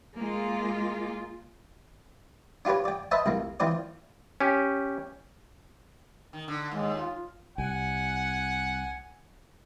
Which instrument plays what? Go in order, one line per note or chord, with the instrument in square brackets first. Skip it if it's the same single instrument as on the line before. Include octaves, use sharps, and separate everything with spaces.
[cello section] G#3 A#3 F4
[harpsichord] D4 F4 G4 B4 C#5
D5 G5
B4 C5 D#5 E5 A5
C2 F2 A#3
E3 F3 C4 C5 D5
[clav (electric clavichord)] C#4 G4
[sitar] D#3
D3
[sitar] D#2 [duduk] G#3
[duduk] F4
[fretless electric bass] C2 [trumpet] F#5 [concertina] G#5